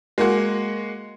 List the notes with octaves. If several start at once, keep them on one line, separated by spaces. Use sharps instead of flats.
G#3 A#3 F#4